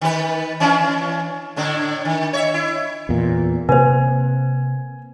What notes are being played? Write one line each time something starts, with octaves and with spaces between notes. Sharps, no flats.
D#3 B4
E3 C#4 D4
A2 D3 D4
D#3
C#5 D#5 E5
E4
E2 A#2
C3 A#3 B4 C5 G#5